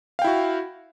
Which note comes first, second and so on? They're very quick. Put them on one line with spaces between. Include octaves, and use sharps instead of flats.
F5 G5 E4 F#4